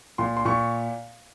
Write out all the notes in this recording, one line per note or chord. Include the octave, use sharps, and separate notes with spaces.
A#2 C6
C6
A#2 C#6